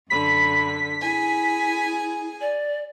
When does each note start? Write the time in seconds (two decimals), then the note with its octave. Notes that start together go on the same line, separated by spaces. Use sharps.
0.10 F#2 D3 B5 B6
1.01 E4 G#4 G#5
2.41 D5